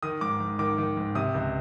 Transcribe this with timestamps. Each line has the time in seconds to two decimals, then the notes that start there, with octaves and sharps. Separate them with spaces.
0.03 D#3 D#6
0.21 G#2 D6
0.40 G#2
0.59 D#3 D6
0.78 D#3
0.97 G#2
1.15 C3 D#6
1.34 C#2